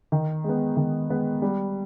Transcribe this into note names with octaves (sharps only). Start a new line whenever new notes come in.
D#3
G#3 B3
D#3
G#3 B3
G3